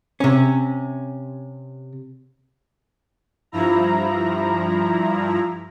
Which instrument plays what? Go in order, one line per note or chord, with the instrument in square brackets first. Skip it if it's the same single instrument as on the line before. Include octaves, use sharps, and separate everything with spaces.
[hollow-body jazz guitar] C3 C#4
[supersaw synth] G2 F3 E4 A#5